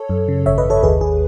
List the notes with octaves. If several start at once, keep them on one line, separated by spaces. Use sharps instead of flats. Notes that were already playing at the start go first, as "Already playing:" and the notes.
Already playing: A4 C#5
F#2
C#3
G#1 C#5 E5
B4 D#5
G#1
A4 C#5
D#2 G#4 B4
D#2 G#4